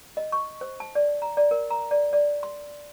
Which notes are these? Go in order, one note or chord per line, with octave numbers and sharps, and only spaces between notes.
D#5
C#6
C5
A5
D5
A#5
D5
A#4
A#5
D5
D5
C6